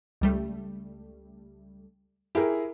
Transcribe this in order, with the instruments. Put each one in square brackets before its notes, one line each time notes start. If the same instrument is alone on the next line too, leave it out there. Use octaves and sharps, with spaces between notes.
[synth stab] C#2 G3 A3
[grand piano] E4 G#4 A#4 [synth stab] G4